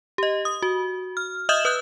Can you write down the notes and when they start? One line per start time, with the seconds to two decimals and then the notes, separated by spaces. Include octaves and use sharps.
0.18 G4 D#5
0.45 D#6
0.62 F#4
1.17 F6
1.49 D#5 E5 D#6 F6 G6 E7
1.65 B4 D#6 F#6 G6